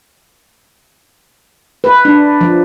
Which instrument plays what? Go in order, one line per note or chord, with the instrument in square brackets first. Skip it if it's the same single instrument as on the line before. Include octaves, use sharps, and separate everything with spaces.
[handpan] B4
D4
F3